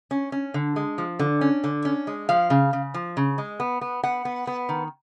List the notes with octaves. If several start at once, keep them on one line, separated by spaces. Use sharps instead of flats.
C#4
C#4
D3
G#3
F3
D3
C#4
D3
C#4
G#3
F3 F5
C#3
C#3
F3
C#3
G#3
B3
B3
B3 F#5
B3
B3
D#3